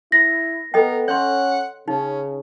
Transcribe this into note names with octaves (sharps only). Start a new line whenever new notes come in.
E4 A#6
B3 A4 A#4 D#5 G5
C#4 C#5 F#5 C6
C#3 C#4 D#4